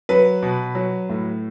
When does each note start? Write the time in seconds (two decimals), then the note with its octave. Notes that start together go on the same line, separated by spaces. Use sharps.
0.09 F#3 B4
0.42 B2
0.75 F#3
1.09 A2